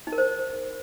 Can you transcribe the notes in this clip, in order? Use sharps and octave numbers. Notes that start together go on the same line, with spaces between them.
D#4
A#4
C5